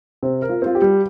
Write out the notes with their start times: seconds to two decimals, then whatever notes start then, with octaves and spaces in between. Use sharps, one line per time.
0.23 C3 C4
0.42 A#4
0.49 F4
0.62 C4 F4
0.75 G4
0.82 G3